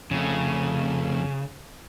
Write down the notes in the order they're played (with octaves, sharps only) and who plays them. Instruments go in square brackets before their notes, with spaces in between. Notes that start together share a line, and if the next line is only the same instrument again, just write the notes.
[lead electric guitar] F2 A3 [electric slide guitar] C#3